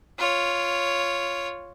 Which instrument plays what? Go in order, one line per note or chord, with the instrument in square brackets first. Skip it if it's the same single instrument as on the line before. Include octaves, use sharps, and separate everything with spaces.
[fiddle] F4 C#5